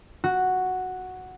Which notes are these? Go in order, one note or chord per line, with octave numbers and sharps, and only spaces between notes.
F#4